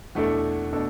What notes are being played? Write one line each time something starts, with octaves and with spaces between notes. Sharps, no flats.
E2 B2 A3 D4 A4
B2 A3 D4 A4